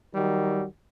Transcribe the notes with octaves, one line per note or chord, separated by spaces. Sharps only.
D#3 F#3 G3